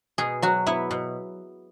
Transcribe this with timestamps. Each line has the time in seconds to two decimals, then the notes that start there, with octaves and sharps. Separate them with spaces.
0.18 B2 G#4
0.42 F#3 F#4
0.66 B3 E4
0.91 B2